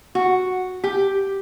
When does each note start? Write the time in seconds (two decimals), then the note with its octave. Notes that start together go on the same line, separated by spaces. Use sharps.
0.15 F#4
0.84 G4